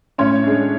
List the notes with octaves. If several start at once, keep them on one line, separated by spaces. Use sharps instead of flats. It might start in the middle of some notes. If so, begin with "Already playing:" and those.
A2 C#4 C#5
G#3 D4